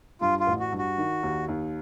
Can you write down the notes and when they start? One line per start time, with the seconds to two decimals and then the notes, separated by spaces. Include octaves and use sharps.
0.21 G2 F4
0.40 F4
0.47 A1
0.60 F#4
0.72 G2
0.78 F#4
0.98 D#3
1.23 D#2
1.48 D#2